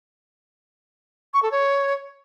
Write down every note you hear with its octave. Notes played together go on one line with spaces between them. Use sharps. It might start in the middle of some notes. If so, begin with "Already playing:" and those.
C#6
A4
C#5